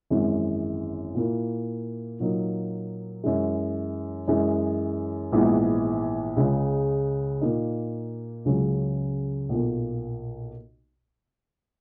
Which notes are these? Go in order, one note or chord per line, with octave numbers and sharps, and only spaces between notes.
G#1 F#2 E3 G#3
A#2 A#3 E4
A#2 F#3 A#3 D#4
F#2 E3 G#3
F#2 E3 G#3
A#1 G#2 E3 B3
C#2 C#3 G#3
A#2 A#3 D#4
C#2 C#3 F#3 C#4
B1 A#2 A#3